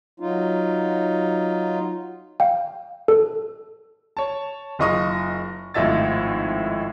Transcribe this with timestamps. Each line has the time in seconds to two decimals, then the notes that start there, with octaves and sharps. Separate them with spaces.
0.20 F#3 D#4 F4
2.40 F5 G5
3.08 A4
4.17 C#5 A5
4.79 F#1 F4 D#5 C#6 D#6
5.74 G#1 A2 F3 D#5 E5 A6